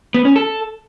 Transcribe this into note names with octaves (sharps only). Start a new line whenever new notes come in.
B3
C#4
A4